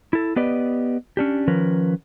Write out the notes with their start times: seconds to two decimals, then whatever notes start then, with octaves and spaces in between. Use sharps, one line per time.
0.13 E4 A4
0.36 B3 G4 B4 D5 D#5
1.17 C#4 D4 G4
1.48 D#3 F3 C#4 A#4 B4